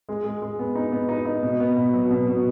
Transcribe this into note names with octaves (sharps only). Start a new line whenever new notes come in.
G#3
G#3
G#3
B3
D#4
B3
D#4
D#4
B2
B3
B2
F#3
B2
B2